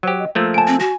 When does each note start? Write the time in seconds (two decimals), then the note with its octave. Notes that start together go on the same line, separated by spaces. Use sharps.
0.03 F#3 G4 C5
0.19 D#5
0.35 F3 A3 A#3 E6
0.54 G#5 A5 D7
0.67 C4
0.80 F#4 G#5